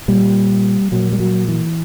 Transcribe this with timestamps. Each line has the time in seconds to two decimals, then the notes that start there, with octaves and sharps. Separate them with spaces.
0.08 A#2 G3
0.92 A#2 F#3
1.12 G3
1.20 F#3
1.48 E3